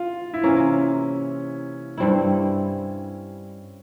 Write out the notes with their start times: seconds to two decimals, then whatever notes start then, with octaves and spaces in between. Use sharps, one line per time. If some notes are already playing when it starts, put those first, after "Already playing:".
Already playing: F4
0.34 E4
0.43 C3 E3 A#3 C#4
1.98 G2 G3 C4 E4